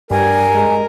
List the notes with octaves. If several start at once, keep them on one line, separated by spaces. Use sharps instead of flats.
G2 G3 A#4 G#5
G#3